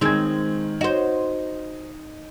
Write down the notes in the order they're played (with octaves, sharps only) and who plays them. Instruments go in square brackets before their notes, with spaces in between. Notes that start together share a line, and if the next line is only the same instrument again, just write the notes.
[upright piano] D#3 G#6 [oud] G#3 C4
[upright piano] D#4 [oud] F#4 C5